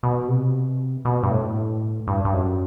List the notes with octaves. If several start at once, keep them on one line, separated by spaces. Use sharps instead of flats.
B2
C3
B2
G2
A2
G2
G2
F#2